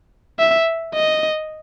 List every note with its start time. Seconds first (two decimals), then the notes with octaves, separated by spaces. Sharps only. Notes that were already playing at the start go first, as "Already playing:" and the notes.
0.39 E5
0.94 D#5